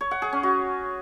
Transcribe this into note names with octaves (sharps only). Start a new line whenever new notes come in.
C#5
F#5
G#4
C#4
F#4